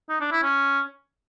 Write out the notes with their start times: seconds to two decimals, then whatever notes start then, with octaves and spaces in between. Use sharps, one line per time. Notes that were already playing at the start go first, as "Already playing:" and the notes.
0.09 D#4
0.20 D4
0.32 E4
0.43 C#4